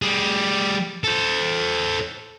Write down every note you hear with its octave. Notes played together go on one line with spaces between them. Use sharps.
G3 G#4
A4 C5